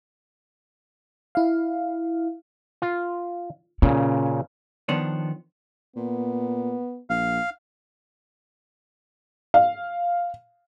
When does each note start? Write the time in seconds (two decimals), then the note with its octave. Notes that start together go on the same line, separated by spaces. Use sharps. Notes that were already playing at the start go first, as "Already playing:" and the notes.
1.35 E4 F5
2.82 F4
3.82 A#2 C#3 C#4
4.89 D#3 F3 B3 D4 C#5
5.96 A#2 B3
7.10 A#1 F5
9.54 F5